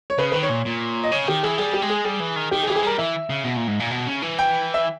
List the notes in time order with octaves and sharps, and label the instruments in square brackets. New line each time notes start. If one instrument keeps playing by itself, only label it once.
[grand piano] C#5
[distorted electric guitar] C#3 [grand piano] B4
[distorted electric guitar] D#3 [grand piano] B4
[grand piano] C#5
[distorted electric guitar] A#2
A#2
[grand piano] D#5
[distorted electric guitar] C#3 [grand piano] C#5
[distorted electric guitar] D#3 [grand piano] G4
[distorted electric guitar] E3 [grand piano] G#4
[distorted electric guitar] G3 [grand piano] G#4
[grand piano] G4
[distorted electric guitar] G#3
[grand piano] G#4
[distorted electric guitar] G3 [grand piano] G#4
[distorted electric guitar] E3
D#3
[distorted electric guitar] D#3 [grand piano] G4
[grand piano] G#4
[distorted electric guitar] E3 [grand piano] G4
[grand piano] G#4
[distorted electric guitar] G3 [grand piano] A#4
[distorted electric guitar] E3 [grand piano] E5
[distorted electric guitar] C#3
B2
A#2
G#2
A#2
B2
C#3
E3
[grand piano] G5
E5